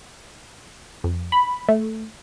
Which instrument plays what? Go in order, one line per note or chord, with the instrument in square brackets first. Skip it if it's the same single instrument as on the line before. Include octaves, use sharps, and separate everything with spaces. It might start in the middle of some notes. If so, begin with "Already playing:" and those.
[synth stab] F2
B5
A3